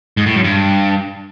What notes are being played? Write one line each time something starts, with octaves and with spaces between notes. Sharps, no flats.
G#2
A2
F#2
G2